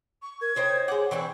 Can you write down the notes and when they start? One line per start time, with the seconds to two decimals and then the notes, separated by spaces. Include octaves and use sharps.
0.22 C#6
0.41 A#4 G#6
0.56 D#4 C5 C#5 G5
0.88 G#3 F#5 D6
1.11 E3 C4 D4 C#6